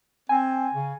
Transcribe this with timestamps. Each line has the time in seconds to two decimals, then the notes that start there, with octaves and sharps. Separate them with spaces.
0.29 C4 G#5
0.73 C#3